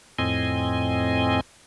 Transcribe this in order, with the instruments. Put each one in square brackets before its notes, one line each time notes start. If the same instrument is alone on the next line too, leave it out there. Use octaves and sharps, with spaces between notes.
[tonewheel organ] F2 A2 C4 D#5 G#5